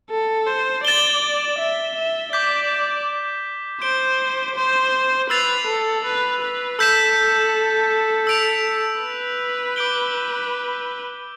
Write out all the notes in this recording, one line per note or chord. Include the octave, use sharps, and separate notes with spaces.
A4
C5
D5 A6 E7 G7
E5
E5
D5 D6 G6 B6
C5 G6 D7 G7
C5
B4 E6 A6 C7 F7
A4
B4
B4
A4 E6 G6 B6 E7
E6 B6 D7 F7
B4
D6 G6 D7 G7